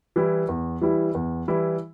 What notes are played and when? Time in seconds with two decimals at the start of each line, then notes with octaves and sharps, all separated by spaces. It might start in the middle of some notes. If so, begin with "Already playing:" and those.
0.16 E3 G3 E4
0.49 E2
0.81 E3 G3 E4
1.15 E2
1.48 E3 G3 E4